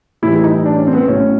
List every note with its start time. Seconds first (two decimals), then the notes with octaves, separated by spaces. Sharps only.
0.22 A2 E3 G3 E4
0.35 E4
0.44 D#4
0.65 D4
0.76 C#4
0.87 C4
0.93 B3
0.97 C4
1.08 A2 F#3 C#4